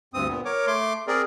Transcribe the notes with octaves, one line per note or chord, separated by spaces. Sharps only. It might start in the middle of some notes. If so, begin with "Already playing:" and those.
D2 G2 C4 D#6
A#2 B3
A#4 C#5 D6
A3 C6 D6
C4 G#4 A#4 D5